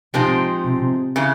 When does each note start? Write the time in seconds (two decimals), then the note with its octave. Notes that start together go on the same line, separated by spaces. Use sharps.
0.14 C3 F3 G#3 C4 D#4
0.65 C3
1.16 C#3 E3